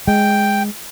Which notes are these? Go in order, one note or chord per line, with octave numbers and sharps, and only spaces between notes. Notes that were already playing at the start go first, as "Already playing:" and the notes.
G#3 G5